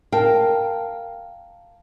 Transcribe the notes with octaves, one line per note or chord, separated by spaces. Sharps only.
A#4 F5 G5 A5